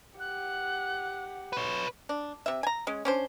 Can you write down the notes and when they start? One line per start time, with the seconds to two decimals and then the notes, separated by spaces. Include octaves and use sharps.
0.20 G4 F#5 F#6
1.53 B4 C#5
2.09 D4
2.46 C3 E5
2.63 G#5 A#5
2.87 G#3 C#4
3.05 C#4 D4 C5